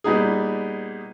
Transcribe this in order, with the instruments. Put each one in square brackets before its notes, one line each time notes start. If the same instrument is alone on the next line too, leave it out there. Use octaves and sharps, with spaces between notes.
[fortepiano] A#2 G3 B3 D#4 G#4